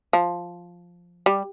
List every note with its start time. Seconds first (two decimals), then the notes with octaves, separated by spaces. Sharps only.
0.13 F3
1.26 G3